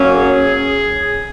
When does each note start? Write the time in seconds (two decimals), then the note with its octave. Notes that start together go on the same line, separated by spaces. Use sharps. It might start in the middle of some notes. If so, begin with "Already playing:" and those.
Already playing: F#3 A#3 C#4
0.14 G#4